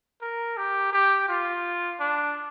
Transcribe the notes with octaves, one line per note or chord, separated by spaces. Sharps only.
A#4
G4
G4
F4
D4